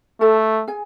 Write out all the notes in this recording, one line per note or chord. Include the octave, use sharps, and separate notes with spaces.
A3 A4 A5
G#4 G#5